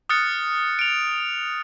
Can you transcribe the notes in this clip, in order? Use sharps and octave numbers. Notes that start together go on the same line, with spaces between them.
D#6 F6 F#6 A6 C#7
D7 F7